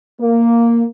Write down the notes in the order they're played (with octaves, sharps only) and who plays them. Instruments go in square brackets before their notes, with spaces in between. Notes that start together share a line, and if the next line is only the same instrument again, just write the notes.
[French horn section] A#3